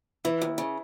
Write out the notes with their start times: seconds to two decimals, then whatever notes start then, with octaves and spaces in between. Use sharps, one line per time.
0.25 E3 E4
0.41 D#2
0.58 C#3